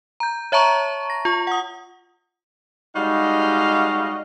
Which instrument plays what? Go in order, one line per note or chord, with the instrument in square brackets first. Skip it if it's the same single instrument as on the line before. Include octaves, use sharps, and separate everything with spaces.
[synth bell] A#5 G6
C#5 E5 A5 A#5 C#6
A#6
F4 C#6
F#5 D#6
[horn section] G3 G#3 D#4 F#4 D#5 F5